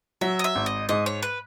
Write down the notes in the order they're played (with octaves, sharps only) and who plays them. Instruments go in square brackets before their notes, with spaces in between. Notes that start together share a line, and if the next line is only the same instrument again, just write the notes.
[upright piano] F#3 [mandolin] E5
[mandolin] D#5
E5
[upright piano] G#1
[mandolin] D#5
[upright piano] G#2 [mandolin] D#5
[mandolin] C#5
B4